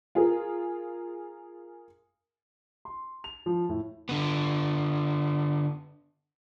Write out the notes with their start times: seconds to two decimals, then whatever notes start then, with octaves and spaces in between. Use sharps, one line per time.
0.15 F4 G#4 A#4
2.85 C6
3.24 F7
3.46 F3
3.69 A2
4.09 D3 B3